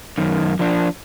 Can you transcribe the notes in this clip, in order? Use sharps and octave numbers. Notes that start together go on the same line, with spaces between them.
F#2 D#3
F3 D4